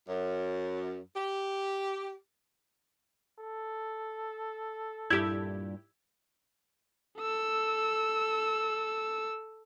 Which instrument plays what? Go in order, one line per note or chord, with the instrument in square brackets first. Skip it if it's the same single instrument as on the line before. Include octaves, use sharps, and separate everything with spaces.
[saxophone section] F#2
G4
[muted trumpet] A4
[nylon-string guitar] G2 A#2 [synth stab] E4 G4 [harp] E6 G#6
[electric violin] A4 E6